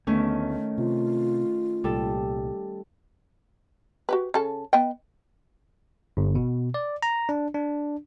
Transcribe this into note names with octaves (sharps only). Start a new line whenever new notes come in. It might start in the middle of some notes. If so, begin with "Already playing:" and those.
D2 D3 D#3 A3 B3 C#4
C3 F4
C2 A#2 G3 A4
F#4 G4 B4
C#3 A4 A5
B3 D#5 G5
G1
B2
D5
A#5
D4
D4